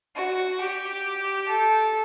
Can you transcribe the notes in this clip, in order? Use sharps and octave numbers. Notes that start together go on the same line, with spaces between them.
F#4
G4
A4